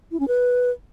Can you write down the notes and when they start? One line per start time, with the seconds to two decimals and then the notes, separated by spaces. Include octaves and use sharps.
0.12 E4
0.20 C#4
0.28 B4